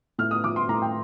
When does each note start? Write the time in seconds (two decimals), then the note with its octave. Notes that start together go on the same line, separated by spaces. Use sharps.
0.19 A2 F6
0.31 D#6
0.44 F3 D6
0.56 C6
0.69 A2 A#5
0.82 G5